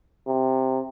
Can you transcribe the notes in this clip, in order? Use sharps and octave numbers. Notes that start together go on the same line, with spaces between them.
C3